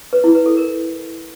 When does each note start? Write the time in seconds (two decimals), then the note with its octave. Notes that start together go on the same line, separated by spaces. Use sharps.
0.13 B4
0.24 E4
0.35 B4
0.46 A4
0.57 A#4